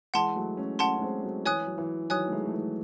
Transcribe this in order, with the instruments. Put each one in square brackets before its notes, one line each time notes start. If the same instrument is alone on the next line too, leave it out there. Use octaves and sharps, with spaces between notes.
[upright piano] E3 G#3 [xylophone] F#5 A5 C6
[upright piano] F#3 A3
A3 C#4
[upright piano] A3 C#4 [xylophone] F#5 A5 C6
[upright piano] C#4
G#3 C4
F#3 A3
[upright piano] E3 [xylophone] C#5 G#5 D#6 F#6
[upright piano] F#3
E3
[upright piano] D#3 F#3 [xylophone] C#5 G#5 D#6 F#6
[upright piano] A3
E3 G#3
A3
E3 G#3